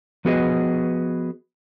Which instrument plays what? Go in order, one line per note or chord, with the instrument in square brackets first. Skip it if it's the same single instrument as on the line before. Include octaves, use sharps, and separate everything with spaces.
[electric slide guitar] F3 B3 F#4 G#4 B4 D#5